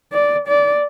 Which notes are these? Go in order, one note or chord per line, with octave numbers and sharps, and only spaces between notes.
D5
D5